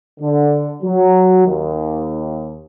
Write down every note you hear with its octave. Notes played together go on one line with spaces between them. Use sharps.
D3
F#3
D#2